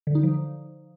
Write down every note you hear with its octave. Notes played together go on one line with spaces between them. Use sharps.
D3
D#4
F3